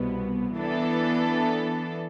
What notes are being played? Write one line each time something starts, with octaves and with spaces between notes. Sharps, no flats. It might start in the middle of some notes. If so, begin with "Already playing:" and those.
Already playing: C2 B2 B3
E3 B3 D4 A4